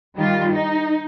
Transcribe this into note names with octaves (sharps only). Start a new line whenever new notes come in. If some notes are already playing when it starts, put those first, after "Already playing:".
D#3 G3 F4
D#4